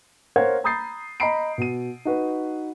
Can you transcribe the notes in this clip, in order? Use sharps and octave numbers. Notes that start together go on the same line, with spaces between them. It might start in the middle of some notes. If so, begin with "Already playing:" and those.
A#4 C5 C#5 F5 F#5 G#6
A#5 B5 D#6 G6 A6 C7
D#5 A#5 B5 C7 D7
B2 D#7
D#4 F#4 B4